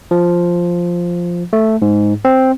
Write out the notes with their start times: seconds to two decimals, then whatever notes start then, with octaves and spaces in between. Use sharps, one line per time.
0.11 F3
1.53 A3
1.82 G#2
2.25 C4